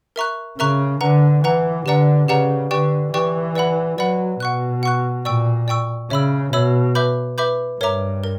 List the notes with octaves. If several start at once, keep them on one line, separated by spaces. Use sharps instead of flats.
A#4 E5 A#5 C#6 F#6
C#3 A#4 E5 A#5 C#6 F#6
D3 B4 F#5 A#5
E3 B4 F#5 A#5
D3 G4 B4 D5 F#5 A#5
C#3 G4 B4 D5 F#5 A#5
D3 G4 B4 D5 G5 C#6
E3 G4 B4 D5 G5 C#6
B4 D5 F#5 B5
F#3 B4 D5 F#5 B5
B2 F#5 C#6 F#6
F#5 C#6 F#6
A#2 D5 G5 C#6 E6
D5 G5 C#6 E6
C#3 C#5 E5 B5 E6
B2 C#5 E5 B5 E6
B4 E5 B5 D6 G6
B4 E5 B5 D6 G6
G2 A#4 C#5 E5 A#5 D6
A#4